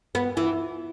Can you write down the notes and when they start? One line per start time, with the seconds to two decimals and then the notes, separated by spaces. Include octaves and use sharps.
0.15 B3
0.37 E3